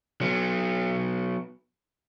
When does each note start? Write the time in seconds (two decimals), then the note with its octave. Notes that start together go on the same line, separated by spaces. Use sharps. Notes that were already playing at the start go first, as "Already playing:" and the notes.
0.21 F#3 B3